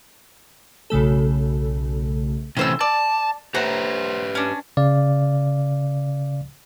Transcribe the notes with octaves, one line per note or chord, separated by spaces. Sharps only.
B1 C#3 A3 A4
C3 E3 A3 C#4 C5 E6
D5 A5
G4 B4 C5 E5 F#5 A#5
C#4 D4
C#3 D5 F5